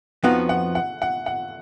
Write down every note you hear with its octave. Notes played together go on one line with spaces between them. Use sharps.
F2 F3 B3 D#4 F#4 F#5
F#5
F#5
F#5
F#5